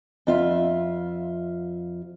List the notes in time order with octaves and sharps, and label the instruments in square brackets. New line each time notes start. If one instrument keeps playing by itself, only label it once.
[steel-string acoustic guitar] F2 F4 E5